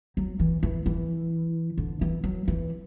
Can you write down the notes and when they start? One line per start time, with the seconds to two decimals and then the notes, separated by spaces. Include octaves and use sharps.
0.17 F#3
0.40 E3
0.63 E3
0.86 E3
1.78 D3
2.01 E3
2.24 F#3
2.48 E3